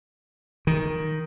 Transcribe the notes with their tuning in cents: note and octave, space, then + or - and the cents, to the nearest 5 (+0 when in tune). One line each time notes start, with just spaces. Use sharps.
D#3 +5